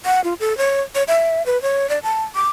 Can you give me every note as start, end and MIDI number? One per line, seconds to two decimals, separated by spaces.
0.05 0.21 78
0.24 0.34 65
0.40 0.57 69
0.58 0.81 73
0.95 1.03 73
1.08 1.45 76
1.46 1.60 71
1.62 1.89 73
1.89 1.99 74
2.03 2.23 81
2.35 2.50 86